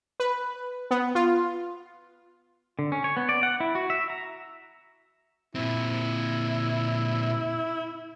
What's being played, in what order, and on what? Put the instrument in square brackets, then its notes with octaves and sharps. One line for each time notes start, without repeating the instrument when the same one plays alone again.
[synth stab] B4
B3
F4
[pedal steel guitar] D3
C#4
C#5
B3
D5
F#5
E4
F#4
E5
A#5
[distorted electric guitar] A#2 C4 [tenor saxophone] E4